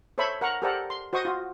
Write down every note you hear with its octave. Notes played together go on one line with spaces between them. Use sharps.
A4 C5 C#5 E5 B5 C#6
A#4 F#5 A#5 C#6
G4 A4 A#4 C5 D5 F#5
C6
F#4 C5 D#5 C#6 D#6
F4 F#4